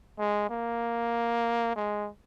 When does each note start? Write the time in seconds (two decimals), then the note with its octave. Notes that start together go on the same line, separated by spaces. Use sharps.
0.19 G#3
0.50 A#3
1.76 G#3